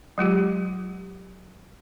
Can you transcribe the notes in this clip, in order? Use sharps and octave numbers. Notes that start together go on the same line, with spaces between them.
F#3 G#3 F4 G4